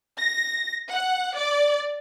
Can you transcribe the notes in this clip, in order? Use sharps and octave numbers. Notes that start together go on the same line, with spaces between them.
A#6
F#5
D5